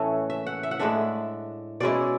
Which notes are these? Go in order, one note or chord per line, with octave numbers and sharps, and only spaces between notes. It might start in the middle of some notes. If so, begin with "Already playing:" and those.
Already playing: A2 E3 A3 C#4 E5
E5
F#5
E5
F#5
A2 G#3 D4 E5
B2 G#3 C#4 E4 D5